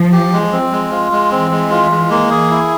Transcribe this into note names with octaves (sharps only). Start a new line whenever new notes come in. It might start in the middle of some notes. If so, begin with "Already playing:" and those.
Already playing: F3
G4
G#3
C4
G#3
F4
G#3
E3 C4
G#3
F4
G#3
A#3
G#4
E4